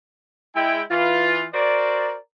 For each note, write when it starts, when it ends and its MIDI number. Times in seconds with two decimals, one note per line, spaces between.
0.55 0.82 56
0.55 0.82 64
0.55 0.82 79
0.91 1.45 52
0.91 1.45 65
1.54 2.17 66
1.54 2.17 70
1.54 2.17 72
1.54 2.17 74